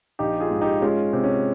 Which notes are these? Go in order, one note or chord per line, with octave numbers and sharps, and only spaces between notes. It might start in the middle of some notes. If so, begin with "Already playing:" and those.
A#1 D#4 G4
F4 G#4
G#2
D#4 G4
G#3 C#4 F4
C3
C#4